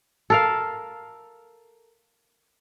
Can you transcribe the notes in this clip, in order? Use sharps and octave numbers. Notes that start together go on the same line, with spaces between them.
A4 A#4 F5